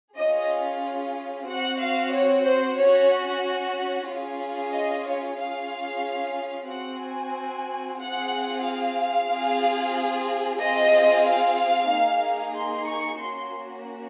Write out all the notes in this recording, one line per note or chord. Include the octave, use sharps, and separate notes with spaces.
C#4 F4 G#4 D#5
C4 F#4 F#5
F5
C#5
C5
C#4 F#4 C#5
C#4 F4 G#4
D#5
C#5
C#4 F4 G#4 F5
C4 F#4 F#5
G#5
C4 F4 G#4 F#5
F5
C4 F4 G#4
C4 F4 G#4 D#5
F5
A#3 D#4 G#4
C6
C#6
A#3 C#4 F#4 C6